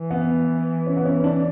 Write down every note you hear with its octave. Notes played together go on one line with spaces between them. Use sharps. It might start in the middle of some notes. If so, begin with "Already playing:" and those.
Already playing: E3
B3
C#4
B3
C#4
D4